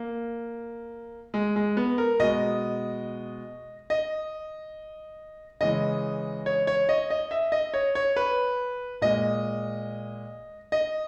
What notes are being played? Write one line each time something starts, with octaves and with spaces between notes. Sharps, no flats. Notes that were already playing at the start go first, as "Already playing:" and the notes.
Already playing: A#3
G#3
G#3
B3
A#4
B2 G#3 D#5
D#5
C#3 E3 G#3 D#5
C#5
C#5
D#5
D#5
E5
D#5
C#5
C#5
B4
A#2 G#3 D#5
D#5